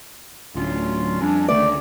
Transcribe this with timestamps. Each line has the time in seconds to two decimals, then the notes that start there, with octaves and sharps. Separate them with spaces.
0.55 D1 D2 F#3 C#4 F4
1.21 F2 G3 C#4 D4
1.48 C#2 D3 D#3 A3 D5